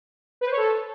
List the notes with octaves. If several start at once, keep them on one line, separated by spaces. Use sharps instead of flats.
B4
C5
C#5
A4